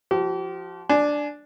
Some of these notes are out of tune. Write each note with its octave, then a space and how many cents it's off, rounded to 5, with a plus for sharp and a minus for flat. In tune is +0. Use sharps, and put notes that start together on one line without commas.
F3 +0 G4 -40
D4 +0 G#5 +35